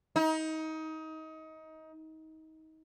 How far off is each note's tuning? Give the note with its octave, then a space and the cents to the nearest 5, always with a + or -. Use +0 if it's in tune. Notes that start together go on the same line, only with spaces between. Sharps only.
D#4 +25